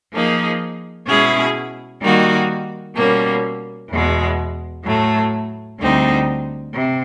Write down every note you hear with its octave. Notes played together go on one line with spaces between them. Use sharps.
F3 A#3 D#4 G#4
B2 G#3 C#4 E4 G#4
D#3 G3 A#3 D#4 F#4
B2 G3 A#3 C#4
E2 B2 G#3
A2 F#3 A3
D2 D3 G3 C4 D#4
C3